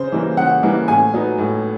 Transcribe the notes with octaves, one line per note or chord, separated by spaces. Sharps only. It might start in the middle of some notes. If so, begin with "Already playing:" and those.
Already playing: C#3 C5
E3 G3 A#3
C#3 F#5
E3 G3 A#3
A2 G#5
F#3 B3 D#4
A2